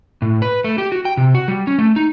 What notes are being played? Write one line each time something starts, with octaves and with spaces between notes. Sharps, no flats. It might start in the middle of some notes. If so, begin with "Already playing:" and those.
A2
B4
A3
G4
F#4
G5
C3
F#4
G3
C#4
A3
D#4